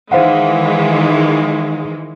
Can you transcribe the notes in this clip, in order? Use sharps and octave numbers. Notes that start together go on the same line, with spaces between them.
D#3 E3 G#3 C5 F5 F#5